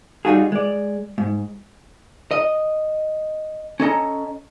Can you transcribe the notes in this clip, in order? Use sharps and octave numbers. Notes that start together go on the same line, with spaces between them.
G3 D#4 F4 F#4 G#4
G#3 D5
G#2
D#5
C#4 A4 D#5 A#5